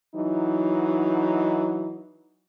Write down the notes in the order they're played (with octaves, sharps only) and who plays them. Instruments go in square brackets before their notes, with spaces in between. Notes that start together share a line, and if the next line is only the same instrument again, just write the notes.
[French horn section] E3 F#3 D#4